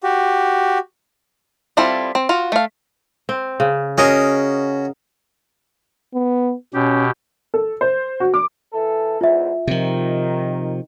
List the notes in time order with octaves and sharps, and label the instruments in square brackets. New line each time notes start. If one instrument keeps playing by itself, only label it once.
[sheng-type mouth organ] F#4 G4
[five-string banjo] G3 C4 E4 F4 A4
C4
F4 F#4
A3 F5
[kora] C4
C#3
[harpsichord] C#4 F#4 [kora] G#4 A#4 D#5
[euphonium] B3
[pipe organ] B2 G4 [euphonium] C#4
[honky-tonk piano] A4
C5
F#4
D6
[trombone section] E3 A4
[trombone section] E2 G#2 [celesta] F4 E5
[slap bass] C3 F3 [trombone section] D#3